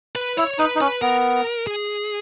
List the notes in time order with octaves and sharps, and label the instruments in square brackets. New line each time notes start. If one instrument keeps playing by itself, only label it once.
[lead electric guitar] B4
[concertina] E4 [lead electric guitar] C#5
[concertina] D#4 [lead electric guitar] B4
[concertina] D#4
[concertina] C#4 [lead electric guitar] B4
[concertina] B3 [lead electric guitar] A#4
[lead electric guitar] G#4